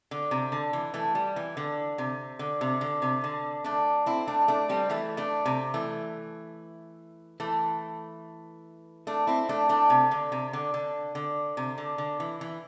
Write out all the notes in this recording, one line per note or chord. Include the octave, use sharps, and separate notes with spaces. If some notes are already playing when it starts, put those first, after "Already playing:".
D3
C3
D3
E3
E3 A3
G3
E3
D3
C3
D3
C3
D3
C3
D3
A3 D4
C4 E4
A3 D4
A3 D4
G3 C4
E3 A3
A3 D4
C3
E3 A3
E3 A3
A3 D4
C4 E4
A3 D4
A3 D4
C3
D3
C3
D3
D3
D3
C3
D3
D3
E3
E3